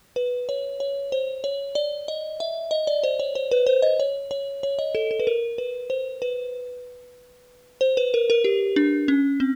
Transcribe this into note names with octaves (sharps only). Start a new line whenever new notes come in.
B4
C#5
C#5
C5
C#5
D5
D#5
E5
D#5
D5
C5
C#5
C5
B4
C5
D#5
C#5
C#5
C#5
D#5
A4
A4
B4
A#4
B4
C5
B4
C5
B4
A#4
A#4
G4
D4
C#4
C4